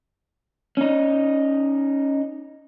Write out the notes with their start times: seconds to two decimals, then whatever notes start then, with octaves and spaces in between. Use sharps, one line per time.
0.77 C#4 D#4